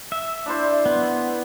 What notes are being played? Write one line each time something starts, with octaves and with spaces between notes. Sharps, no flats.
E5
D4 E4 C5
B3